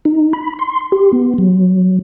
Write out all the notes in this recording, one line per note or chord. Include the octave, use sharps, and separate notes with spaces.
D#4
B5
C6
G4
B3
F#3